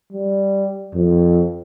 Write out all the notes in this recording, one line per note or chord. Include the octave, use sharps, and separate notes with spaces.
G3
F2